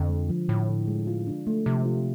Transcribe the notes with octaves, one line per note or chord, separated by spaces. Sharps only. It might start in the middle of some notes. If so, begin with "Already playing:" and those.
Already playing: F2 D3
G#3
F3
A2 D3
D3
G#3
F4
D4
A3
C3 F3
F4